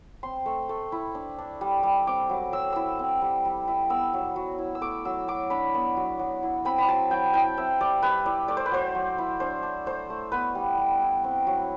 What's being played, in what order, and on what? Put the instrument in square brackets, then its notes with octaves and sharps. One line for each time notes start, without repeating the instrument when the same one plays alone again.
[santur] C4 C6
A3
A3
E4
D4
D4
G3
G3
C4 D6
F#3
F#3 E6
E4 E6
C4
G3
G3
E4
B3 E6
F#3
F#3
E4
E6
A3 D6
F#3 E6
F#3 D6
D4 B5
B3
F#3
F#3
E4
C4 B5
B5
F#3 A5
F#3 G5
E4 G5
C4 E5
G3 D5
G3 B4
E4 D5
A3 D5
C5
B4
F#3 C5
F#3
E4
D4 C5
D4
A3 C5
A3
B3 B4
G3
G3
E4
C4
F#3